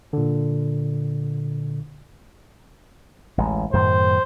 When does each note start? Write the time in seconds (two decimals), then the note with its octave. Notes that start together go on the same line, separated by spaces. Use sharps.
0.13 A#2 D3
3.38 A1 D2 G#3
3.73 F#2 A2 D#3 C5